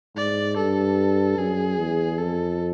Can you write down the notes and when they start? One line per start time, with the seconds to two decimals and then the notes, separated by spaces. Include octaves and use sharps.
0.16 G#2 D5
0.57 G2 A4
1.38 F#2 G#4
1.78 E2
2.18 F2 A4